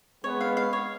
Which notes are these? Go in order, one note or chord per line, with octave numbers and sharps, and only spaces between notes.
G#3 B3 C#5
F5
F5
C#5